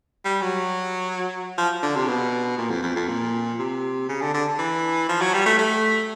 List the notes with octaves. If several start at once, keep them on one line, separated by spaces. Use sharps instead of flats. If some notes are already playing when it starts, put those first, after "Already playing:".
G3
F#3
F3
D3
C3
B2
A#2
F2
F2
F2
A#2
C3
C#3
D3
D3
E3
F3
F#3
G3
A3
A3